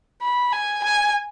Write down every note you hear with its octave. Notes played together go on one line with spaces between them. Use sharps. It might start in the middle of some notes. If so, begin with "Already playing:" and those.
B5
G#5
G#5